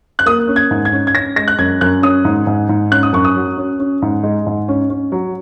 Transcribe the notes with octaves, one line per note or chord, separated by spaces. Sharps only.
F#6
A#3 D#6
C#4
G#6
G#2
G#6
C#4
G#6
C#4 A#6
G#3 A#6
F#6
F#2 G#6
F#2 F#6
C#4 D#6
G#2
G#2
G#2
C#4 F#6
D#6
F#2 C#6
D#6
F#3
C#4
C#4
G#2
G#3
G#2
C#4
C#4
F#3